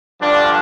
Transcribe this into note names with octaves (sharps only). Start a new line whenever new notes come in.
G2 D3 F3 D4